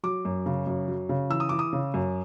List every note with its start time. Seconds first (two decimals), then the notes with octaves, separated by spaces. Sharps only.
0.03 F#3 D6
0.25 F#2
0.46 C#3
0.67 F#2
0.88 F#3
1.09 C#3
1.30 E3 E6
1.40 D#6
1.49 E3 D6
1.59 D#6
1.73 C#3
1.94 F#2